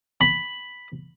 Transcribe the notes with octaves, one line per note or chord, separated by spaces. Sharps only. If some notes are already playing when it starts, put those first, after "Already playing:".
B5